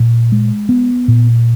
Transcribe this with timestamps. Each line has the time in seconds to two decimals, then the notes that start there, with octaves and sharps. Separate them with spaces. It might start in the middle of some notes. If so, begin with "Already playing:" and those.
Already playing: A#2
0.32 G#3
0.69 B3
1.08 A#2